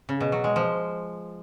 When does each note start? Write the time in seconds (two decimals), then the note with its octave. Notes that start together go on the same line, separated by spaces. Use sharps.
0.09 C#3
0.20 B2
0.32 F#3
0.44 G#3
0.56 F3